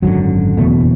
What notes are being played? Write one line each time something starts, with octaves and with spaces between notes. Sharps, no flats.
G#1 F#2 D3 F#3
F#1 E2 B2 A3